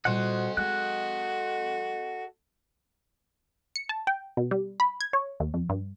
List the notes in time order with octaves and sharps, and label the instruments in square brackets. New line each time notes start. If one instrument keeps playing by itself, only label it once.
[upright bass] A#2 G3 [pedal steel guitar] F#4 C5 F#5 [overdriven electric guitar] A4 D#5
[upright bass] G#3 [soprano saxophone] F#4 [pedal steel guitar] F#6
[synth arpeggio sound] C#7
A5
G5
B2
G3
B5
G#6
C#5
D#2
F2
G2